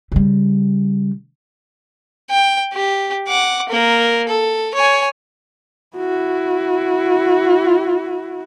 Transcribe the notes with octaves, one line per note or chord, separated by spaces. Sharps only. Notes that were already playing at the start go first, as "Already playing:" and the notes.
C#3 G3
G5
G4
F#5 D6
A#3 A#4
A4
C#5 G#5
E4 F#4